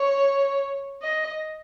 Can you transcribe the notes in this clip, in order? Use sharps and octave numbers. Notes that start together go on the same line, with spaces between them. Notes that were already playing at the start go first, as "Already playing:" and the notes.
Already playing: C#5
D#5